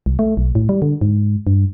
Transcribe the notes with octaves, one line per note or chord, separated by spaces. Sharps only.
C2
A3
B1
A2
G3
D3
G#2
G2